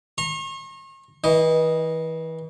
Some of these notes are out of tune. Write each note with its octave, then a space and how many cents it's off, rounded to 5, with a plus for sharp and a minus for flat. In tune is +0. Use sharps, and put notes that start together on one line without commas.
A#5 -10 C#6 -45
E3 -35 D#5 +0